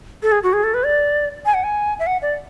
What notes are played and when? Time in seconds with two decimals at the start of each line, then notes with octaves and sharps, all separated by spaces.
0.23 A4
0.32 G#4
0.43 F#4
0.53 G#4
0.64 A4
0.74 B4
0.84 D5
1.45 G#5
1.54 F#5
1.64 G#5
1.99 E5
2.07 F#5
2.22 D5